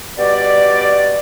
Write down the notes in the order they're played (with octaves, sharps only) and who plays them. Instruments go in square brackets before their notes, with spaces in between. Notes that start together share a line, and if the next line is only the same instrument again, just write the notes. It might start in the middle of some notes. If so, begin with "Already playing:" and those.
[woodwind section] B2 G3 F#4 D5